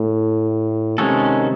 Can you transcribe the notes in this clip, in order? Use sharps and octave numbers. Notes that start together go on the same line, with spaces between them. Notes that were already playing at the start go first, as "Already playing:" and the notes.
Already playing: A2
C3 D#3 G#3 C#4 F#4 A4